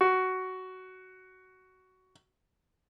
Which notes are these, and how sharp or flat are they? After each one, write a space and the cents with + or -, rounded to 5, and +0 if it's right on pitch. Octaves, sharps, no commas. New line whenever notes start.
F#4 +10